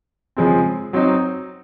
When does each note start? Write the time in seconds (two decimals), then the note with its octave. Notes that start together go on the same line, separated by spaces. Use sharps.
0.37 C#3 F3 G#3 C4
0.93 F#3 C4 D#4